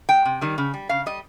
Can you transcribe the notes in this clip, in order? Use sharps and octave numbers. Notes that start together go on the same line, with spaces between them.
G#3 G5
C3
D#3 G3
C#3
G3
C#3 F5
G3 D#5